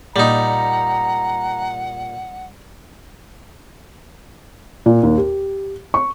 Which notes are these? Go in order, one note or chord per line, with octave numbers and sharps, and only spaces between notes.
A#2 G3 D#4 F#5 A#5
A#2
D#2
G4
C#6